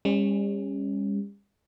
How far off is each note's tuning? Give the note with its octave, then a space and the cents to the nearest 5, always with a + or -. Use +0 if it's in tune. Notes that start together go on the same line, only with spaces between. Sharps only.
G3 +45 C#4 -10